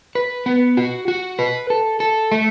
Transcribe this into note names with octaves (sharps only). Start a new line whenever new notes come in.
B4
B3
F#4
F#4
B4
A4
A4
A3